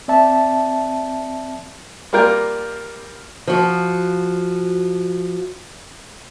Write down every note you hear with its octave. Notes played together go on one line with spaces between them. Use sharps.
C4 D5 E5 A5
G3 A#3 F4 A#4 D5 G5
F3 F#4